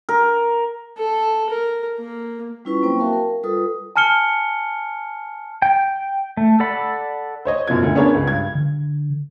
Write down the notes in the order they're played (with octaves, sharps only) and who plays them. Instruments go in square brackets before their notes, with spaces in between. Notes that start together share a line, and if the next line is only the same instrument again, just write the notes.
[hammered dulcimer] A#4
[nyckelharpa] A4
A#4
A#3
[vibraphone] G3 C#4 E4 F4 B4 C#6
F#3 A#3 C4 C5 G5 C#6
F#4 A#4 E5 F5 G5 A5
A#4
G3 F4 A4 B4 D#6
[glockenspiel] G#5 A5 F6 C#7 G7
[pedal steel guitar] G5
A3
A4 D5 F#5 B5
[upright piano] C5 C#5 D#5
F#2 B2 F3 G#6
D2
B3 C#4 D4 G#4 A#4 C#5
C#2 G#3
G2 G#6
[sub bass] D3